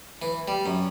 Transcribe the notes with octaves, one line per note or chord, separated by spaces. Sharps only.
E3
G3
F#2